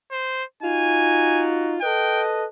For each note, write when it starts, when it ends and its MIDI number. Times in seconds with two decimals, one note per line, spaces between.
0.12 0.44 72
0.63 1.78 63
0.63 1.78 65
0.63 1.78 66
0.63 1.44 80
1.81 2.45 69
1.81 2.45 71
1.81 2.45 75
1.81 2.23 79